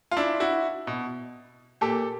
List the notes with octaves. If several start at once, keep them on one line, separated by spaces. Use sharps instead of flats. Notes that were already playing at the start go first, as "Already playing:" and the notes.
F4
D4 E4
E4 F#4
B2
A#2 G4 A4